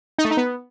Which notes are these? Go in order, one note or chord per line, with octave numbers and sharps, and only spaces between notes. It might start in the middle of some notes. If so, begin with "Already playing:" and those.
D#4
A3
D#4
B3